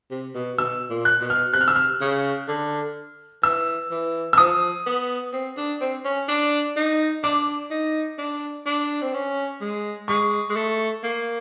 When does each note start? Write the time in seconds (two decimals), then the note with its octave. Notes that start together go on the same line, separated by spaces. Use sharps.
0.11 C3
0.34 B2
0.58 B2 E6
0.90 A#2
1.05 F#6
1.21 B2
1.30 F6
1.53 C3 F#6
1.61 F6
1.68 E6
1.76 F6
2.01 C#3
2.48 D3
3.43 E3 E6
3.91 E3
4.33 E6
4.38 F3 D#6
4.86 B3
5.33 C4
5.57 D4
5.81 C4
6.05 C#4
6.28 D4
6.76 D#4
7.23 D4 D6
7.70 D#4
8.18 D4
8.66 D4
9.02 C4
9.14 C#4
9.61 G#3
10.08 G#3 C#6
10.50 G#3
10.56 A3
11.03 A#3